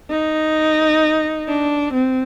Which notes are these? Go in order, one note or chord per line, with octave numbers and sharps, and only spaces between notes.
D#4
D4
C4